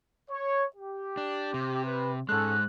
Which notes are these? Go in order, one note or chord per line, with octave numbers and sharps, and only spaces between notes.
C#5
G4
D4
C3
B4
G#2 G#3 C#4 A4 F#6